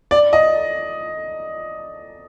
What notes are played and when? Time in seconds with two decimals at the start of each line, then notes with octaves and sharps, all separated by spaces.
0.11 D5
0.33 D#5